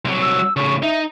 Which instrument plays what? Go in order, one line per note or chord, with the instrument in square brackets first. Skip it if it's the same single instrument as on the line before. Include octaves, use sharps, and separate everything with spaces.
[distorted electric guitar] C2 F#3
[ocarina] E6
[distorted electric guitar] A2 C#3 [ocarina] C#6
[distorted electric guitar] D#4 [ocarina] E5